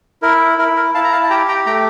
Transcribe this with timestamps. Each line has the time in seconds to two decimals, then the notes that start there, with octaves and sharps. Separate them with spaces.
0.22 E4 A#4
0.58 E4 A#4
0.76 A#4
0.94 E4 F5 A5
1.04 A#5
1.12 F5 A5
1.23 A5
1.30 G4 G5 A#5
1.48 G5 A#5
1.66 A3 G5 A#5